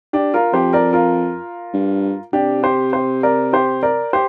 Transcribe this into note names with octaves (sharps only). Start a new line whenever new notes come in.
D4 G4
F4 A#4
F2 G4 C5
A#4 D5
F4 A#4
G2
C3 D4 G4
G4 C5
G4 C5
A#4 D5
G4 C5
A#4 D5
G4 C5